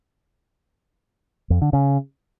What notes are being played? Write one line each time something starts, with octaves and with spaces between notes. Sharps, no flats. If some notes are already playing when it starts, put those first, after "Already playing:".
F2
D3
C#3